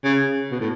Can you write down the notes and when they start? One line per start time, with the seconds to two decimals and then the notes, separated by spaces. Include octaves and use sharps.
0.04 C#3
0.51 B2
0.60 A2